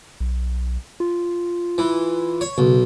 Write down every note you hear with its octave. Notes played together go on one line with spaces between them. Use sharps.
B1
F4
E3
C#5
B1 C#3